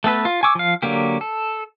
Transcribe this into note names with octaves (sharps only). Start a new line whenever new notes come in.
A3 B3 A4 B4
F4
G#5 C#6 D6 E6
F3 F5
D3 F#3 A#3 G4
A4